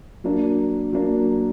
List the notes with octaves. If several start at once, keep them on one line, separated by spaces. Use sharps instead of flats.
F#3 A#3 D4
F#3 A#3 D4